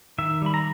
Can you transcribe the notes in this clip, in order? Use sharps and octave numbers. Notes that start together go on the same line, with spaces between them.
D#3 E5
G3 B5
A#5